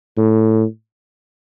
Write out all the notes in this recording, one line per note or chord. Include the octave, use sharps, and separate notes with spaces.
A2